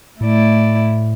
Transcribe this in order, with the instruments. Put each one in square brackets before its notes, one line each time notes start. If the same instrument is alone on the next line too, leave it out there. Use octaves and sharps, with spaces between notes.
[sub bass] A2 [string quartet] A3 E4 D5